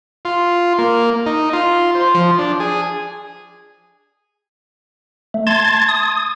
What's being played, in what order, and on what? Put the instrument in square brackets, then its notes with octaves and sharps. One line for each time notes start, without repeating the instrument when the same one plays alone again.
[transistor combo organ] F4
A#3
D#4
F4
C5
F3
D4
G#4
[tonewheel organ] A3
A5 C6 G#6 A6
D#6